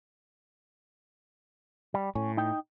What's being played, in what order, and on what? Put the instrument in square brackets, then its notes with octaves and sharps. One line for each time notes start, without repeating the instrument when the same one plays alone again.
[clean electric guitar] G3
[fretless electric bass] A2 [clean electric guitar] C#4
[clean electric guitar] D#4 G5